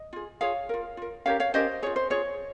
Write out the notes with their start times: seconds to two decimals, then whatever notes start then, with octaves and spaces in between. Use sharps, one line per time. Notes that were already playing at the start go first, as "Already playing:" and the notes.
Already playing: D#5
0.13 F4 G#4
0.41 F4 G#4 C#5 F5
0.69 F4 A#4
0.97 F4 A#4
1.26 C#4 G4 A#4 C#5 F5
1.40 C#5 F5
1.54 C#4 G4 A#4 C5 D#5
1.82 F4 G#4 C#5
1.96 C5
2.10 F4 G#4 C#5